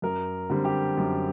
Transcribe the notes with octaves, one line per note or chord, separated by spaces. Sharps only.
F#2 A#4
D3 G3 C4
G4
F#2